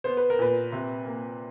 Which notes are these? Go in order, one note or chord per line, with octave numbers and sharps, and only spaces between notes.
B3 C5
B4
A#4
A#2 B4
C3
A#3